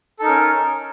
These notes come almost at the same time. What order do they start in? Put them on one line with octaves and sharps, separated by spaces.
A4 D#4 A#4 C#4